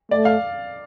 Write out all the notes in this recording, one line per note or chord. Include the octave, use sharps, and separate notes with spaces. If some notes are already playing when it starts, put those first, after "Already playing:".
A3 D5
F5